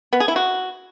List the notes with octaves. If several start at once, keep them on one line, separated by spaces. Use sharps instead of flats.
B3
G#4
E4
F#4